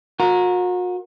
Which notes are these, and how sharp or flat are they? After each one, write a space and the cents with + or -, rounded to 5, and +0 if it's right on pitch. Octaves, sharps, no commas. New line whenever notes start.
F#4 -40 A#4 +0